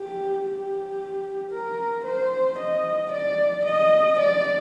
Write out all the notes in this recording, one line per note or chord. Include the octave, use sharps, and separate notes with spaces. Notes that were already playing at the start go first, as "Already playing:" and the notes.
Already playing: G4
G4
A#4
C5
D#5
D5
D#5
D5